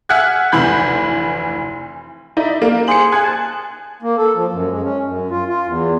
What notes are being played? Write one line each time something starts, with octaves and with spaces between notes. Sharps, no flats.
E5 F#5 G#5 F6 F#6 G#6
F1 D2 E3 B5 G6
D#4 E4 D5
A#3
G#4 C5 C#7 F#7
G#4 G#5 F#6 G#6
A5
A#3
A4
F3
F#2
G#3
C#4
F#2
F4
F4
E2